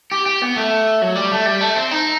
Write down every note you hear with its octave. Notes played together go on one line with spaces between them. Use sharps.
G4
G4
B3
A3
F#3
G3
A3
G3
A3
C4
D#4